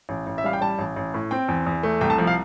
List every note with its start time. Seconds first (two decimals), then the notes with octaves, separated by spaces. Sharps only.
0.09 A1
0.27 A1
0.38 E5
0.44 G3 F5
0.53 G5
0.61 G3 A5
0.79 A1
0.96 A1
1.14 A2
1.31 C4 G5
1.48 E2
1.66 E2
1.83 A3
2.01 C2 G5
2.10 A5
2.18 F3
2.27 F5